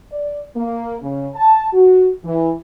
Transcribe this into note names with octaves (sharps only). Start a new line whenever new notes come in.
D5
A#3
C#3
A5
F#4
E3